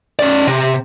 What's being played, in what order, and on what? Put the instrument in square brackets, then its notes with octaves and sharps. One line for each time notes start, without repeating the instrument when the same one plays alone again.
[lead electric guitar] C#4 D5
C3